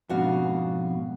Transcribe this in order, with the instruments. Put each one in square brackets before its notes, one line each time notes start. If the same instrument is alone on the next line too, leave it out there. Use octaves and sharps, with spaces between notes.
[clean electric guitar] F2 G#2 B2 [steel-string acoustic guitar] D4 F#4 F5